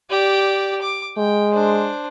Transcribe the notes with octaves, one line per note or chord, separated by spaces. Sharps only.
G4 D5
D6
G#3 G5
D4 C5